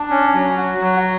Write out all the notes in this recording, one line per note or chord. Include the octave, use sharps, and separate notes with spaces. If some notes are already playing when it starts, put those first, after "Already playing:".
Already playing: D4
C#4
F#3
F#4
F#3